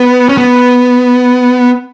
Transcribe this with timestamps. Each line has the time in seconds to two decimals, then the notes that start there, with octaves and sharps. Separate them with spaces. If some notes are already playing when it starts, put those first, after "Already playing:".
Already playing: B3
0.29 C#4
0.38 B3